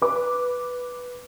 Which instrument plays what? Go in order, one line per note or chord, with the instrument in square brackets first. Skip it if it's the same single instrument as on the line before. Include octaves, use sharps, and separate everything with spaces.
[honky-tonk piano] B4 D6